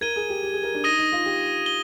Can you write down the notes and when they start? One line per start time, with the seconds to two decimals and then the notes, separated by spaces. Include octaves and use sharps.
0.01 A#4 G#6 D#7 G7
0.16 G#4
0.29 G4
0.43 G4
0.53 G#4
0.63 A#4
0.75 D4
0.84 D#4 D#6 A#6 D#7 G7
0.99 D#4
1.12 F4
1.26 G4
1.66 G7